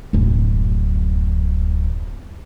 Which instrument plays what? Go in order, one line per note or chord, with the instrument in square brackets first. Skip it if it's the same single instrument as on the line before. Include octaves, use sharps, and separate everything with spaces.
[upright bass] D1 F#2